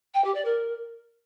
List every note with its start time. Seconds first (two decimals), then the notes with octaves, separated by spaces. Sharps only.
0.14 G5
0.24 G4
0.35 D5
0.45 A#4